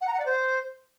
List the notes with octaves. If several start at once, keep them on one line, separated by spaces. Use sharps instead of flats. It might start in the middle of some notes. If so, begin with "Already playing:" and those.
F#5
A#5
F#5
D5
C5